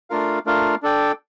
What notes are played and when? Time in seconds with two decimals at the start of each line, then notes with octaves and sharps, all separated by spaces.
0.10 A3 D4 F4 A#4 F5
0.46 A3 D4 F4 A#4 F5
0.83 D4 A4 D5 G5